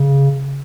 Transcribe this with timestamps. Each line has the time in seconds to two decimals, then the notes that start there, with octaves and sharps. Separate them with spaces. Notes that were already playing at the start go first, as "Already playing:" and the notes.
Already playing: C#3